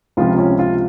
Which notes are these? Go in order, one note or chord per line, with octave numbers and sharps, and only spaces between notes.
C#2 C3 F3 F4
C#4
F4